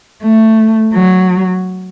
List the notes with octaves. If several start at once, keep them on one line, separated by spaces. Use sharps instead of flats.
A3
F#3